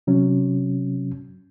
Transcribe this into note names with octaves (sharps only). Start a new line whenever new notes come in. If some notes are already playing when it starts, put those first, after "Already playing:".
C3 F#3 C#4